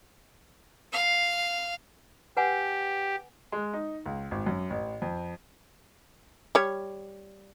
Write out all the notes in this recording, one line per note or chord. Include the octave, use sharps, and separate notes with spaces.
F5
G4 B4 F#5 G#5
G#3
D#4
C#2
G#1
F#2
A1
F2
G3 C#5